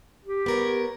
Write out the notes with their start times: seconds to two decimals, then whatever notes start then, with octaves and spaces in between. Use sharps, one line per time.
0.25 G4
0.46 B3 A#4 C#5